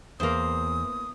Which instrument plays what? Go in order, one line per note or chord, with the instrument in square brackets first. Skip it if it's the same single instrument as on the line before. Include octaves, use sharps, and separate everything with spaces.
[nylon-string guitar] E2 [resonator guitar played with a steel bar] A#3 C5 [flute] D#6